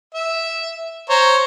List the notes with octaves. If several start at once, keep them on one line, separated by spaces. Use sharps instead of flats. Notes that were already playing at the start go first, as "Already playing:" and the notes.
E5
C5 C#5 A#5